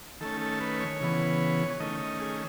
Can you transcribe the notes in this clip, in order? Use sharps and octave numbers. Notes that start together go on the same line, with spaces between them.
D#3 A3 C#4 A4
A4
B4
C#5
C#3 E3 B3
D#3 A3 C#4 D#5
D#5
G#4